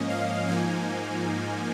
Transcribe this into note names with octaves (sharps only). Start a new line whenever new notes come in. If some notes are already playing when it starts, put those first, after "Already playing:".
Already playing: G#2 F3 A#3 C#4 D#5
F5
G#2 F3 A#3 D#4 G#5